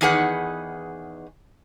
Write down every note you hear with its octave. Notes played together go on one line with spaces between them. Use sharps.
E2 D#3 D#4 G#4 B4 F#5